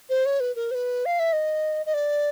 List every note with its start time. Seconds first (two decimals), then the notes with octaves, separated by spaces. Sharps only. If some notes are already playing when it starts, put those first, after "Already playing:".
0.10 C5
0.26 C#5
0.40 B4
0.56 A#4
0.71 C5
0.75 B4
1.06 F5
1.19 E5
1.33 D#5
1.86 D#5
1.94 D5